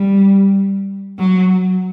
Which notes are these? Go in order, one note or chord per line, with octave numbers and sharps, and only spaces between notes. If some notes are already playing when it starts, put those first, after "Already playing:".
Already playing: G3
F#3